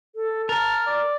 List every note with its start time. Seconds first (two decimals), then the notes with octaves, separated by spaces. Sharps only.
0.15 A4
0.49 A#4 A5 F6
0.87 D5